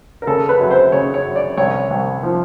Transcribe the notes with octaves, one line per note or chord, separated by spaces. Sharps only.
A#4
C#3 A4
B4
F#2
C5
C#3 C#5
C#5
F#2
D5
C2 C#5
C2
F3